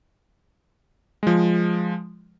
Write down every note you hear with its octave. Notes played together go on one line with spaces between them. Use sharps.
F3 G#3